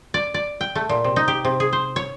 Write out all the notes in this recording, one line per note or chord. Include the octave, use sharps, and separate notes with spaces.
D5
D5
G5
A3
A#2
C3
D#4
G4
C3
G#4
C5
C#5